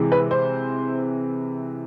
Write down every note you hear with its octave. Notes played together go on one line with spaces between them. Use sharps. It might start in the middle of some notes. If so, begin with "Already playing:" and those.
Already playing: C3 E3 G#3
B4
C5